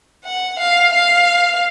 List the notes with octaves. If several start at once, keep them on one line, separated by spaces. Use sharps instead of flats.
F#5
F5
F5